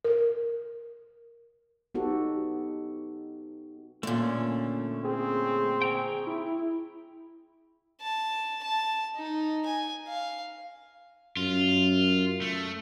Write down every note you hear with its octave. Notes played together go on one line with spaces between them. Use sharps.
A#4
B3 D#4 F#4 G4 A4
A#2 D3 A3 C#4
C4 G#4
G5 A#5 C#6
E4
A5
A5
D#4
G#5
F5
F#2 F4
A3